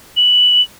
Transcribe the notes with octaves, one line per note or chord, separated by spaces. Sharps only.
F#7